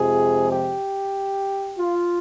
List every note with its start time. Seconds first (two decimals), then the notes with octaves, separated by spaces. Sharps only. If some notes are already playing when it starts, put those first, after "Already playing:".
Already playing: F2 C3 F3 G#3 G#4
0.51 G4
1.77 F4